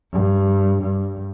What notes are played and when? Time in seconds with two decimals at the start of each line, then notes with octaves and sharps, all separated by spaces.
0.12 G2
0.82 G2